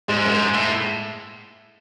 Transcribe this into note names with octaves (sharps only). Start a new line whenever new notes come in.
G#2 G#3
F#2
G#2
A2